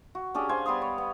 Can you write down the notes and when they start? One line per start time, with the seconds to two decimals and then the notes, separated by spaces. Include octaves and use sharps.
0.15 F#4
0.34 C#4 D4 G4 G#4
0.49 C5 F5 G#5
0.66 G3 B3 C6 D#6
0.82 C#5
0.98 B3